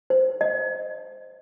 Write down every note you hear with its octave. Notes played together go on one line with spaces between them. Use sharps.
C5
D#5